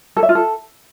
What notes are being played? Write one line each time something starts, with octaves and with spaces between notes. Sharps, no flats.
A4
E5
F4
A4